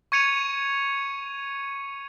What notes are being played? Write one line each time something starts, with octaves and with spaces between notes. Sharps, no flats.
C#6 G#6 C#7 D#7 F7